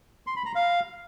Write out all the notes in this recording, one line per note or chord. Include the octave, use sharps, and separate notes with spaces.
C6
B5
A#5
F5